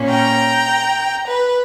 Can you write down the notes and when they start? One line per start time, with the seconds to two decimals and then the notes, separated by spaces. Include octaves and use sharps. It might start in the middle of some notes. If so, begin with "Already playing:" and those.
Already playing: A#2 A#3 C#4
0.09 G5 A#5
1.27 B4